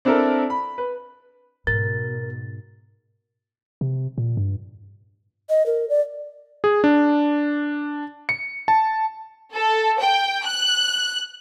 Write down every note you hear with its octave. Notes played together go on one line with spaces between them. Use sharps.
C4 D4 E4 A4 A#4
B5
B4
G#2 B2 A#4 A6
C3
A#2
G2
D#5
A#4
D5
G#4
D4
C#7
A5
A4
G5
F#6